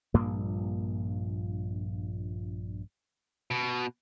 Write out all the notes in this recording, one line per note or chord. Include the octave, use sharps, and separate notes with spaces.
A#1 G2 A#2 A#3
B2